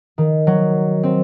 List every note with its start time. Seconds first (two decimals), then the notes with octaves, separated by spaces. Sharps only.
0.18 D#3
0.47 F#3
1.03 C4